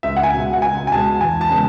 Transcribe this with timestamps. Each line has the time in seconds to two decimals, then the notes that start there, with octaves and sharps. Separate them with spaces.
0.03 C#2 E5
0.16 F#5
0.23 G#5
0.33 B2 G#3
0.53 F#5
0.62 C#2 G#5
0.87 G#5
0.91 B2 G#3 A5
1.20 E2 G#5
1.41 A5
1.50 C#3 G#3 B3